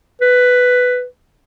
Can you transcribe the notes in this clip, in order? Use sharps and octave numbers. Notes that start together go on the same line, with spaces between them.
B4